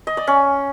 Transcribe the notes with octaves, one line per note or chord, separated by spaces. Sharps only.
D#5
D5
C#4